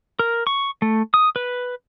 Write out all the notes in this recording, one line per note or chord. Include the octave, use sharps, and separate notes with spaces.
A#4
C#6
A3
D#6
B4